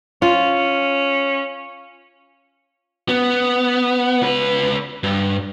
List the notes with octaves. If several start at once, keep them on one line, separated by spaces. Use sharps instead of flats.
C#4 F4
B3
C#2 B4
G2